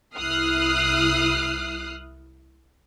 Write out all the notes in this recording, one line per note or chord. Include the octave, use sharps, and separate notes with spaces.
C2 E4 D#6 F6 F#6 C7